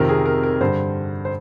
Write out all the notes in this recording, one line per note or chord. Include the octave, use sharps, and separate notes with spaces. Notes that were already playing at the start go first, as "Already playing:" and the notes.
Already playing: F2 C3 D#3 A#4
G#4
A#4
A#4
G2 D3 C5
C5